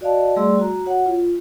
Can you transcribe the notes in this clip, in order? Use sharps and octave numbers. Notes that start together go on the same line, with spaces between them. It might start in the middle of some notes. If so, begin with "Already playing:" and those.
F#4 D5 D#5 F5 A5
G3 A3 G#4 D5 C6 E6
F#4 A#5
F#4 C#5 F#5
F4